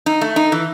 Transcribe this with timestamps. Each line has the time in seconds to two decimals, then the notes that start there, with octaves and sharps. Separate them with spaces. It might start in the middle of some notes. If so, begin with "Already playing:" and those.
0.06 D#4
0.21 A3
0.36 D#4
0.52 E3